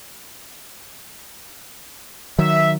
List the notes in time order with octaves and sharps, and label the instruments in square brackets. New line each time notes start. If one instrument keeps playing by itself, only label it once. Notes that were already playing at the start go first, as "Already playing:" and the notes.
[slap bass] D#3 F#3 [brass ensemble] E5